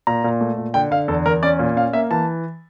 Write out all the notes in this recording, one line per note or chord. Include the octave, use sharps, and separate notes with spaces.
A#2 A#5
A#2
A3
A#2
D3 G5
D3 F5
E2 A4
E2 A#4
C#4 D5
A#2
C#4 F5
A#3 E5
E3 A5